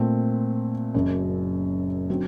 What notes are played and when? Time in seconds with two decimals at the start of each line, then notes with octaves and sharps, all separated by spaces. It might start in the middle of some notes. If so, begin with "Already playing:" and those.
Already playing: A#2 A3 C4
0.94 F#1 F#2 F#3
2.10 D3 F#3 C4